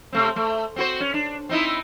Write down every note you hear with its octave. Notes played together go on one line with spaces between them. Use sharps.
C3 A3 C4
A3
C4 F#4 C5
C#4
D4
C4 D#4 E4